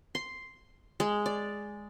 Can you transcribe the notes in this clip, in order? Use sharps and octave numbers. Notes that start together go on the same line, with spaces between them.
C6
G#3
D5